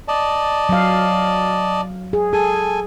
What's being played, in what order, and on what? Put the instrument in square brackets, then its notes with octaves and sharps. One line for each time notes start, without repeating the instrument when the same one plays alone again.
[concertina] D5 D#5 A5
[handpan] F#3 F5
G#4
[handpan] G#4 [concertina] A4 G#5